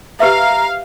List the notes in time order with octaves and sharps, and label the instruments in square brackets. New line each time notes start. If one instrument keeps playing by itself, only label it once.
[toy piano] G4 B4 E5 [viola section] F5 [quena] A#5